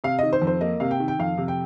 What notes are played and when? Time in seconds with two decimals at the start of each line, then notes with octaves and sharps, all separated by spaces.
0.04 C3 F5
0.19 D#3 D#5
0.33 C5
0.42 F2
0.47 C5
0.61 A#3 D#5
0.80 C3 F5
0.91 G5
1.00 D#3
1.08 G5
1.19 F2 F5
1.38 C3
1.48 G5